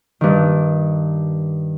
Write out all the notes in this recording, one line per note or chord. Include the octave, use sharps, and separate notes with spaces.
G2 D#3